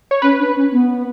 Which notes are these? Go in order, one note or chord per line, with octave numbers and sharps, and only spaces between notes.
C#5
C#4 B4
D4
C#4
B3